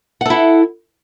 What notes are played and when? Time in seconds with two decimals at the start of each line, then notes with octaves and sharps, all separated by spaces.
0.21 F#5
0.25 A4
0.30 E4